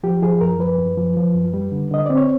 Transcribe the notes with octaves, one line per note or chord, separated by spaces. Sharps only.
F3 G4
F3 G#4
F#2 A#4
F3 B4
F#2
F3
F3
F#2
G3
D3
D3 D#5
C4 D5
C#5